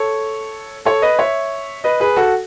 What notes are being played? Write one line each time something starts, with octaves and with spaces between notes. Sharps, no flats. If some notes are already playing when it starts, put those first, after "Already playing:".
Already playing: A4 C#5
A4 C#5
B4 D#5
C#5 E5
B4 D#5
G#4 B4
F#4 A4